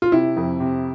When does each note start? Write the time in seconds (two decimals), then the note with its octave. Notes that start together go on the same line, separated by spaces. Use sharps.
0.02 F4
0.12 C3 E4
0.37 F2
0.60 C3